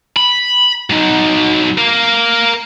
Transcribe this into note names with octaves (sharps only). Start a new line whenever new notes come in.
B5
F#3 D#4
A#4 F5